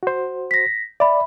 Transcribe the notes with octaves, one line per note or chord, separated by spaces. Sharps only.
F#4 C5
A#6 B6
D5 E5 B5